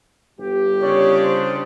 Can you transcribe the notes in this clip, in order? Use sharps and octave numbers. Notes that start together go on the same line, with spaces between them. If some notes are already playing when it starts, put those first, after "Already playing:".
G1 G3 G4
C#3 D4 C#5
C5